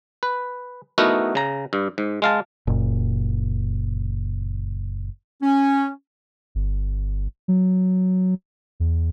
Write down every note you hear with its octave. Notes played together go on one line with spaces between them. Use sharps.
B4
A3 B3 D#4 E4 F#4 A#4
C#3 A#5
G2
G#2
G#3 F5 A5
F#1 A#2
C#4
G1
F#3
E2